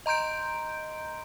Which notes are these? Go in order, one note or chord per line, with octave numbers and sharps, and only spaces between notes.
D#5 A#5 C6 G6 D7